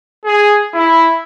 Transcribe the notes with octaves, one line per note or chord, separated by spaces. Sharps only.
G#4
E4